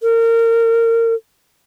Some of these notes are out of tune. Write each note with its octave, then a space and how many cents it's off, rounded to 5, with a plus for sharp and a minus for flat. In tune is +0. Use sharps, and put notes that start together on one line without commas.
A#4 -25